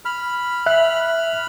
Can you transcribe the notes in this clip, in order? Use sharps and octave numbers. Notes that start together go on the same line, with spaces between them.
B5 F6
E5 F#6